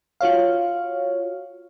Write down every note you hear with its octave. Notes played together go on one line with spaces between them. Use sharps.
F4 F#4 C#5 F5